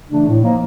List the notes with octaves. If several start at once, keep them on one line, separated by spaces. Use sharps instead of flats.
C#3 E3 A3 D4
A2
F3 A#3 D#4